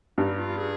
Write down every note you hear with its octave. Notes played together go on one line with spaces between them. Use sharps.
G2 D#4
F4
G#4